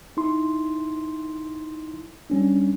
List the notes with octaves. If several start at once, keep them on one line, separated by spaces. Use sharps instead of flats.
D#4 E4 C6
G3 C#4 D4